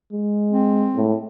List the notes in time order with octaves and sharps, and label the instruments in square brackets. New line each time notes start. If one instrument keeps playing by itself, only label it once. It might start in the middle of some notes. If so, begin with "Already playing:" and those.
[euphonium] G#3
[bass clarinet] C4
[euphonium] A2